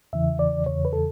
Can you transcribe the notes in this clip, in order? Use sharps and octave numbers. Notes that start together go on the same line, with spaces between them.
E2 C#3 E3 E5
D5
E2 C#3 E3 C#5
B4
A4